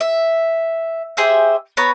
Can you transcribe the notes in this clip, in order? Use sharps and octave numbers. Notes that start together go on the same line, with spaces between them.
E5
G4 G#4 C5 E5
B3 C#5 A#5 B5